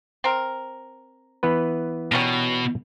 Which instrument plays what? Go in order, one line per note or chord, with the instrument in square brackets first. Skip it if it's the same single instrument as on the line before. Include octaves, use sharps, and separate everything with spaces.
[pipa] C4 A#4
[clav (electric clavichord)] E3 B3 B4
[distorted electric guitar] B2 [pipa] D#3 G3 C#4